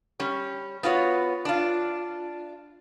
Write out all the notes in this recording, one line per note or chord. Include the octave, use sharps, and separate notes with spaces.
G3 C#4
B3 F4 F#4 C#5
D4 F4